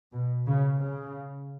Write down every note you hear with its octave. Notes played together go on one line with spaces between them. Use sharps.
B2
C#3
C#3